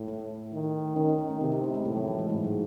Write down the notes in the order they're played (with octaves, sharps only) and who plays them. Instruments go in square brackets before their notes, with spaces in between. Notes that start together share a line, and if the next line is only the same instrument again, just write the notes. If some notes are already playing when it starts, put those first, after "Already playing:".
Already playing: [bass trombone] A2
[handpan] A3
[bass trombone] D#3
[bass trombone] D#3 [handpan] C#4
[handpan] D#4
C#4
A3
[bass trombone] C3 [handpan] C4
[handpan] D#4
E4
G#3
[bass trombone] A2 [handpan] G#3
[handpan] F#3
E3
G#3
[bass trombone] G#2 [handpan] G#3
[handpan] F#3